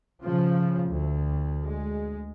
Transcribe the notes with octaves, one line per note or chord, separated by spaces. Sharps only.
C#3 F3
D2
G#3